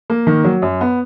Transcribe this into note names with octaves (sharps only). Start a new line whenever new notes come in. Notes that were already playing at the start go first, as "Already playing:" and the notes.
A#3
D#3
F#3
F#2
B3